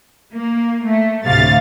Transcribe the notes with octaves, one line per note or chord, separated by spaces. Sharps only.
A#3
A3
D2 A2 C3 F5 A6